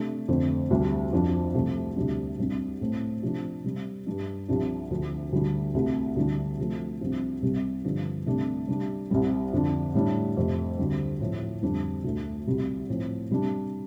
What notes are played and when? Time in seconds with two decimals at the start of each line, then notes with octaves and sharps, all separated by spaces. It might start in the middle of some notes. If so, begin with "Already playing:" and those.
Already playing: C3 A3 D4
0.28 F2 D3 A3 C4
0.70 D2 C3 G3 D4
1.12 F2 F3 D4
1.54 C2 C3 F3 A3 C4
1.96 D2 C3 G3 D4
2.38 C2 C3 G3 D4
2.81 A2 A3 C4
3.22 C3 F3 D4
3.64 C3 G3 C4
4.06 G2 G3 D4
4.48 C2 C3 F3 D4
4.90 D2 D3 F3
5.32 D2 D3 G3 D4
5.74 C2 C3 A3
6.16 D2 D3 G3 D4
6.58 C3 F3 A3
7.01 C2 C3 F3 D4
7.42 C2 C3 G3 C4
7.84 G2 D3 F3 D4
8.26 C2 C3 A3 D4
8.68 C3 G3 D4
9.10 C2 C3 G3 C4
9.53 F2 D3 F3 D4
9.94 A2 G3 D4
10.37 F2 C3 A3
10.78 D2 D3 G3 C4
11.21 A2 F3 A3 C4
11.62 F2 D3 G3 D4
12.04 D2 D3 A3
12.47 C2 C3 G3
12.88 A2 F3 C4
13.31 C3 G3 D4